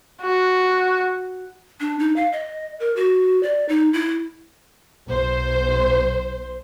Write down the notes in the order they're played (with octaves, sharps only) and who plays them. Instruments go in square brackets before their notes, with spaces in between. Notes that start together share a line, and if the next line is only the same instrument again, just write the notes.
[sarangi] F#4
[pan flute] D4
D#4
F5
D#5
A#4
F#4
D5
D#4
E4
[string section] B1 C5